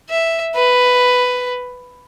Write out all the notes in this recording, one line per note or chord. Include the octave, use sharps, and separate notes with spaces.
E5
B4